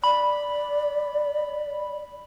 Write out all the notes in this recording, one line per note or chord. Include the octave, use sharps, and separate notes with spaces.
D5 B5